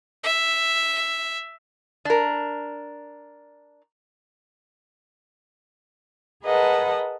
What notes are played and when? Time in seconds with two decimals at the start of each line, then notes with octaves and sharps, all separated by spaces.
0.23 E5
2.05 D4 A#4
6.44 G#4 A#4 B4 D#5 F#5 A5